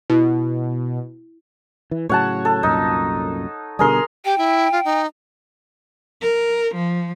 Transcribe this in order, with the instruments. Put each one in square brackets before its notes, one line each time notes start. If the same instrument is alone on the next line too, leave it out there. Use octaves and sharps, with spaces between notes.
[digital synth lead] B2 [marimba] E4
[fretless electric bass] E3
[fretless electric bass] A2 C#3 F#3 [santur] C#5 F#5 A5
[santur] A4
[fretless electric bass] C2 F#2 A#2 [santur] D#4
[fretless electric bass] B2 D3 G3 [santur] G#4 A#4 C6
[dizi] G4 [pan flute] G5
[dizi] E4
F4
D#4
[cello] A#4
F3